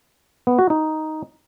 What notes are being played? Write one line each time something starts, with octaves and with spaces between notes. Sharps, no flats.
B3
F#4
D#4